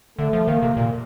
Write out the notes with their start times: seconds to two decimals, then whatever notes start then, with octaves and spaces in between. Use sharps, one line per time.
0.19 D3 A3
0.33 F3
0.48 D#3 A#3
0.62 C3
0.77 A#2